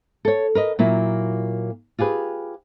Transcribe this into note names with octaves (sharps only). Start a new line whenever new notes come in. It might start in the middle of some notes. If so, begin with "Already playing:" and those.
A4 C#5
A#4 B4 D#5
A#2 F#3 A#3 E4
F4 G4 G#4 B4